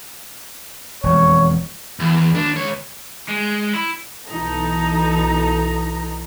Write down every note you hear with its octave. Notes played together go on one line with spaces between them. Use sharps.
E1 F2 C#5
E2
D#2 D4
C#2 C#5
G#3
E4
B1 E3 D#4 A4 A#5